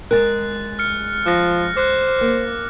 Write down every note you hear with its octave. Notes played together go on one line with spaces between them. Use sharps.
G#3 G#4 A#4 F#6 A6
F6 C#7
F3 F#6 A#6
C5 D6 F#6
A#3